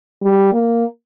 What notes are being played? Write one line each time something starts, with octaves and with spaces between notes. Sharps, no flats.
G3
A#3